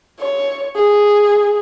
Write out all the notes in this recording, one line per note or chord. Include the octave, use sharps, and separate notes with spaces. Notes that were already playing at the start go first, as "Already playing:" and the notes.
C#5
G#4